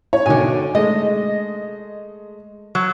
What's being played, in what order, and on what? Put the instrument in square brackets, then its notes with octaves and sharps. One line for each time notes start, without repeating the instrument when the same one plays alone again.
[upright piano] C#5
[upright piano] B2 D#3 [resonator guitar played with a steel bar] D3 G#5
[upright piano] G#3 A3 [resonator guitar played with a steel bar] D#5
[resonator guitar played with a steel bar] F#3